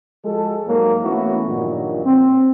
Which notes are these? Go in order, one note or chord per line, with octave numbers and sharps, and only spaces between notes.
F3 G#3 F#4 A4
G#2 F#3 A#3
E3 A3 B3 C#4 E4 F#4
G2 A#2 D#3 F3 F#3
C4